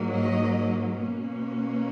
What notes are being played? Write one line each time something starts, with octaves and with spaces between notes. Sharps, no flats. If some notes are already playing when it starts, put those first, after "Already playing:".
Already playing: G#2 F#3 A#3
D#5
B2 A#3 C#4